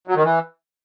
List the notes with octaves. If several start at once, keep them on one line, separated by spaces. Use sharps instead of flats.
F#3
D#3
E3